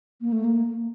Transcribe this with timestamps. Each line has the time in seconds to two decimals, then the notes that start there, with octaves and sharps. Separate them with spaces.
0.21 A#3
0.32 A3
0.44 A#3